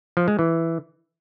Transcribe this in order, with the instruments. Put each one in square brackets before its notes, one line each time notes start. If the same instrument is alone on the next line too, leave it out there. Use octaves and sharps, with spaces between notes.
[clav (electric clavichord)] F3
G#3
E3